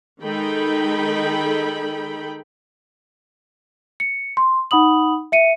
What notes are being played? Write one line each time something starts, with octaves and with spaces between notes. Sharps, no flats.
D#3 G#3 D#4 A4 G5 B5
C#7
C6
D#4 F#5 B5 D#6 F#7
E5 C#7 D#7